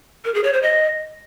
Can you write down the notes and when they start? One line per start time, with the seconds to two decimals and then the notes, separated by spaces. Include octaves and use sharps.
0.25 A#4
0.34 G#4
0.44 C#5
0.53 C5
0.62 D#5